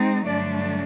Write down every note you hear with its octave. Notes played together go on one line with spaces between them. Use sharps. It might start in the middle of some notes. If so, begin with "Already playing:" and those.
Already playing: G#3 C4 D#4
G2 D3 F#3 A3 D4 D5